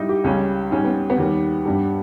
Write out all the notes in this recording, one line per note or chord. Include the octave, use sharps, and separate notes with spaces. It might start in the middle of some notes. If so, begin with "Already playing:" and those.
Already playing: G#2 G3 D#4 E4
G4
C#2 C#3 G3 C#4
G#2 G3 C#4
B3
B3
D#2 D#3 G3
G2 G3